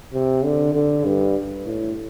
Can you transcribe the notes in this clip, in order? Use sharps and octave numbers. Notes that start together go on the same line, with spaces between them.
C3
D3
D3
G2
A2